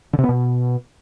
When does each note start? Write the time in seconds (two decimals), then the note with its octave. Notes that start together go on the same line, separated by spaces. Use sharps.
0.13 D3
0.18 C3
0.24 B3
0.29 B2